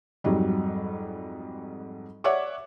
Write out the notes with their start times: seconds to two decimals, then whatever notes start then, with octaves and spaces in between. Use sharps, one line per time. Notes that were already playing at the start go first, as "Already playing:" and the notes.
0.24 F2 G#2 F#3 G3
2.24 C#5 D5 E5 F#5 D6